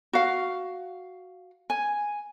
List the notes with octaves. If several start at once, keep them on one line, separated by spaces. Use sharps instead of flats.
F#4 F5
G#5